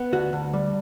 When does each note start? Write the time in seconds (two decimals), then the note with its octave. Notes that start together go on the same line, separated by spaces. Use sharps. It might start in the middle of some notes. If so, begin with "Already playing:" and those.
Already playing: B3
0.13 D2 F#4
0.33 D2
0.54 G3